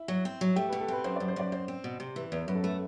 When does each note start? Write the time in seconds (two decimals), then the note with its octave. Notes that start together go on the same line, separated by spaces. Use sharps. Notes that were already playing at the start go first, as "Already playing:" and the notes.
Already playing: E4
0.08 F#3
0.25 C4
0.41 F#3
0.56 A3 G4
0.69 B2 B4
0.80 A4
0.88 C4 B4
1.04 F#2 C5
1.16 F#2 D5
1.28 C5
1.36 F#2 D5
1.52 C4 C5
1.68 C4
1.84 B2
2.00 C3
2.16 E3
2.32 E2
2.48 F#2 B4
2.55 A4
2.62 A3 B4